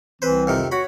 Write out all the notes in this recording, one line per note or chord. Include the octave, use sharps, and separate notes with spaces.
C2 E3 C4 B4 C5
F2 C3 D#3
F#4 C#5 F#5 B5